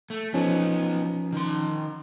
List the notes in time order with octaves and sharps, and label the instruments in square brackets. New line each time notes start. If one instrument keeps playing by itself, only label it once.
[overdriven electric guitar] A3
[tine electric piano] F3 C#4 [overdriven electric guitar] B3 D#4
[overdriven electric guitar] D#3 C6